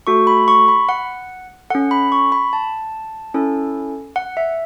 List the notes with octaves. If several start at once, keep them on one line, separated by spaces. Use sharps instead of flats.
A3 F#4 A4 C#6
B5
C#6
B5
F#5
C#4 A4 F#5
B5
C#6
B5
A5
C#4 E4 A4
F#5
E5